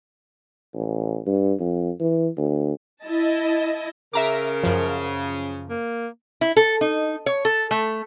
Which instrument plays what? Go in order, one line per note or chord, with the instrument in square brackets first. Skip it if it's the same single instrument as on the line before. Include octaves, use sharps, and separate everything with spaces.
[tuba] A1
G2
F2
E3
D2
[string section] E4 D#5 A5
[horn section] C#3 [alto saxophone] A#4 [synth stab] E5 A#5 D6
[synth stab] F#2 F3
[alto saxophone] A#3
[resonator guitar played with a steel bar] E4
A4
D#4
C#5
A4
A3